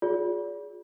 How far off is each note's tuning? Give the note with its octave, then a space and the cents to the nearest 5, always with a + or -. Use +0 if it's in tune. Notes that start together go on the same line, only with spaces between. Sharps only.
F4 +35 G#4 +0 D5 -35